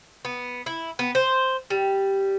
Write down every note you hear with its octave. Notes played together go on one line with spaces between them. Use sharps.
B3
E4
B3
C5
G3